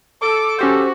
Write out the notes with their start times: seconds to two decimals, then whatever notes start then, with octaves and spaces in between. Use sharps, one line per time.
0.22 A4 D6
0.59 C#4 F#4 G4 C5